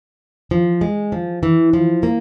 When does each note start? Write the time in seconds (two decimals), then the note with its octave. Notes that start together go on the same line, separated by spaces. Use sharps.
0.51 F3
0.81 G#3
1.12 F3
1.43 E3
1.73 F3
2.03 A#3